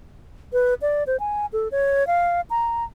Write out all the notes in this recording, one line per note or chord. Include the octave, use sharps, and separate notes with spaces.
B4
D5
C5
G#5
A4
C#5
F5
A#5